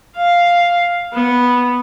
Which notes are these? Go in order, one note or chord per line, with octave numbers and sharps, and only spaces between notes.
F5
B3